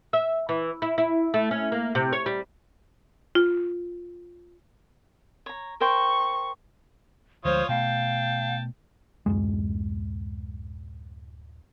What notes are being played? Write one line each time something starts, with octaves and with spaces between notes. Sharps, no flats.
E5
E3
E4
E4
A3
C#4
A#3
C3
C#5
G3
F4
C#5 A#5
A#4 C5 G5 C#6
D2 F3 G#3 F4 C5 C#5 D#6
B2 A3 F5 G5 A5
D1 G#1 F#2 G#3